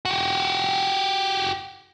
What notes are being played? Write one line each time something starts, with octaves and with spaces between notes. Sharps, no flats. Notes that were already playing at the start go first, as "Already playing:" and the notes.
F#4 G4